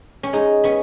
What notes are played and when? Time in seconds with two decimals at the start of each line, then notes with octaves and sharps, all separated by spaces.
0.23 C#4
0.33 G#3 D#4
0.64 B3 C#4